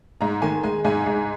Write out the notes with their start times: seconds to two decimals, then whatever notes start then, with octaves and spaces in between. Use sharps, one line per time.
0.21 G#2 A#5
0.42 D#3 G#5
0.63 G#3 G#5
0.84 G#2 G#5
1.06 G#2